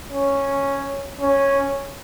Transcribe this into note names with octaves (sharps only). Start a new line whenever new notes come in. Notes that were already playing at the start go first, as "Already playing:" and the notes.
C#4
C#4